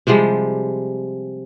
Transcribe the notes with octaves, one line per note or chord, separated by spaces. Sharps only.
C3 F3 G3 G#3